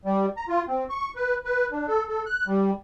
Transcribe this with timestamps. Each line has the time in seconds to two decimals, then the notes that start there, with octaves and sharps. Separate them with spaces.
0.05 G3
0.37 A#5
0.48 F4
0.68 C4
0.90 C#6
1.16 B4
1.45 B4
1.71 D4
1.88 A4
2.08 A4
2.26 F#6
2.47 G3